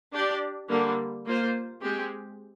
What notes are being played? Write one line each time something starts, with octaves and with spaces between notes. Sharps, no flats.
D4 G4 D5
D3 G3 A#3
A#3 F4 C5
G#3 C4 G4